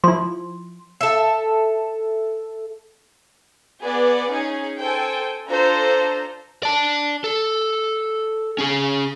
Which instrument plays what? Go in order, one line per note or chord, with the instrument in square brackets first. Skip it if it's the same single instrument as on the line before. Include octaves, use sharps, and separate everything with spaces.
[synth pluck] F3 E4 [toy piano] C6
[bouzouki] A4 E5
[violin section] B3 G#4 D5
C#4 D#4 G#4
A4 C5 G5 G#5
D4 F4 A4 C5 A#5
[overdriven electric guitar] D5 A5
A4
C#4 G#4